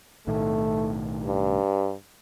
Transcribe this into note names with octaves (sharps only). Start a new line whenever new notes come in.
B1 A2 D#3 A3
G2